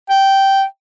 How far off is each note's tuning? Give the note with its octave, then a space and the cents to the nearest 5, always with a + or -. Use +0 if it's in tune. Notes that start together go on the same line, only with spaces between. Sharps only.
G5 -10